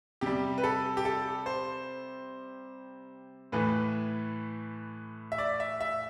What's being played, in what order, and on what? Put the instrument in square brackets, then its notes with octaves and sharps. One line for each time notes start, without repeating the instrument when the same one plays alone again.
[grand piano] C3 G3 G4
B4
A4
G4
A4
C5
A2 E3 A3 B4
E5
D5
E5
E5